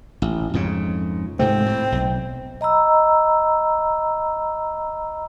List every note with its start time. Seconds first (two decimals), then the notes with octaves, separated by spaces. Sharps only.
0.22 A1
0.54 F2 G#2 C#3
1.39 G#2 C3 A3 C4
1.66 A2
1.92 B1
2.61 D#5 A#5 B5 E6